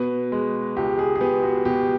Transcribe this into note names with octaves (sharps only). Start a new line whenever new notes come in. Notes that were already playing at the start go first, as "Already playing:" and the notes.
Already playing: B2 B4
G#3
C#2 G4
G#4
G#4
B3 G4
F#4
B2 G4